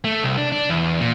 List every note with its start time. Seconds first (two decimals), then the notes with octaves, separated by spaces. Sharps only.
0.04 A3
0.23 C2
0.38 D4
0.52 D4
0.70 E2
1.00 A#2